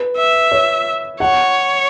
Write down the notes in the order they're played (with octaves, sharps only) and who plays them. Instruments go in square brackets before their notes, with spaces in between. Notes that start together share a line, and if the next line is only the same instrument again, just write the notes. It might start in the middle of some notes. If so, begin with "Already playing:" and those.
Already playing: [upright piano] B4
[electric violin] E5
[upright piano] C#5
[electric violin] C#5 [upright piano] F#5